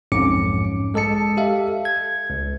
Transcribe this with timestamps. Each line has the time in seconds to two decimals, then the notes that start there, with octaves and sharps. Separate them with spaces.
0.12 B1 F2 G#2 C#4 D6 C#7
0.94 G#3 A4 D#5 A5 C#7
1.37 G4 A4 E5 F5
1.85 G#6
2.30 C#2